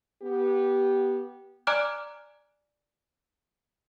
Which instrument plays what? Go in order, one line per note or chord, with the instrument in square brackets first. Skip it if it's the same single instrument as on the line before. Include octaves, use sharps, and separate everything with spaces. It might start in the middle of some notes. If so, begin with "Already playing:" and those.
[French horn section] B3 G4
[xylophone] D5 G#5 A#5 D6 F6 F#6